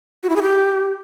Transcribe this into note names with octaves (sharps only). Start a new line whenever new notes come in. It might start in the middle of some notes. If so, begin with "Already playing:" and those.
F#4
E4
G#4
G4